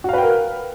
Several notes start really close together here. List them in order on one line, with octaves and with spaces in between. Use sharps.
F#4 F5 B4 G5 A#4